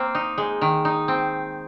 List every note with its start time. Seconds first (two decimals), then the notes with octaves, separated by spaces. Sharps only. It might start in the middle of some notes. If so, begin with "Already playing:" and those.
Already playing: A#3 C4
0.15 D#4
0.38 G#3
0.61 D#3
0.85 D#4
1.08 C4